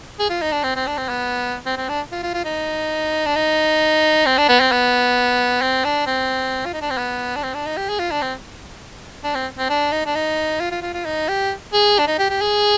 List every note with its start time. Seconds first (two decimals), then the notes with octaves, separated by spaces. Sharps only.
0.19 G#4
0.30 F4
0.42 D#4
0.52 D4
0.64 C4
0.76 C4
0.87 D4
0.98 C4
1.09 B3
1.66 C4
1.77 C4
1.89 D4
2.12 F4
2.23 F4
2.34 F4
2.45 D#4
3.26 D4
3.36 D#4
4.26 C4
4.38 D4
4.49 B3
4.60 C4
4.72 B3
5.62 C4
5.85 D4
6.07 C4
6.65 F4
6.73 D#4
6.82 D4
6.90 C4
6.98 B3
7.36 D4
7.43 C4
7.54 D4
7.66 D#4
7.77 G4
7.89 G#4
7.99 F4
8.11 D4
8.22 C4
9.24 D4
9.35 C4
9.59 C4
9.70 D4
9.92 D#4
10.06 D4
10.15 D#4
10.60 F4
10.72 F4
10.82 F4
10.94 F4
11.05 D#4
11.29 G4
11.73 G#4
11.99 D4
12.08 D#4
12.19 G4
12.30 G4
12.41 G#4